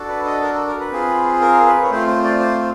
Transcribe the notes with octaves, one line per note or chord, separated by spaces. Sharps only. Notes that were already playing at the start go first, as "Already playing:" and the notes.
Already playing: D4 F#4 A4
B4
D#5
A#4
A4
A#4
B4
C4 F4 G#4
A#4
B4
C#5
A3 C4 F4 C5
C5
D5
C5